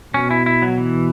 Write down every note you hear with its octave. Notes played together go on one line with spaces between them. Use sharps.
B2 C#4
E4
E4
F#3
E3